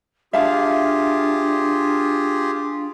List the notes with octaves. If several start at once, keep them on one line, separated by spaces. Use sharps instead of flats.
D4 F4 G4 G#4 E5 F5 A5